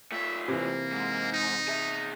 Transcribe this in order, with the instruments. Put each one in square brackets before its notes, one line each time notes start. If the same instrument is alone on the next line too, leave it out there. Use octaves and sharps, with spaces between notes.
[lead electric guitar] A3 F4 [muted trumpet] E5
[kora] C3 E3 [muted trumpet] A#3
[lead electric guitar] G#2
[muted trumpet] D#4
[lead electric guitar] G#4 E5